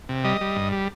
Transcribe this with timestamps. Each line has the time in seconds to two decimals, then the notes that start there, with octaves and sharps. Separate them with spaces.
0.09 C3
0.24 G3 D#5
0.41 G3
0.56 G2
0.72 G3